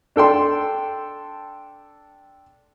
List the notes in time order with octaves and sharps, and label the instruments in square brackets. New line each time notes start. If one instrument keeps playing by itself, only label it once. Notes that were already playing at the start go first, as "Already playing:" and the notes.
[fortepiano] D4 A4 G5 C6